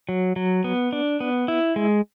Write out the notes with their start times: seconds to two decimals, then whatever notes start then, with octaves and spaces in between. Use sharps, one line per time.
0.09 F#3
0.36 F#3
0.64 B3
0.93 D4
1.20 B3
1.48 E4
1.76 G#3